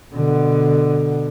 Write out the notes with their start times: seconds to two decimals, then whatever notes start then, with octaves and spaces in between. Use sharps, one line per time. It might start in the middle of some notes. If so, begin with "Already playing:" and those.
0.14 B2 D3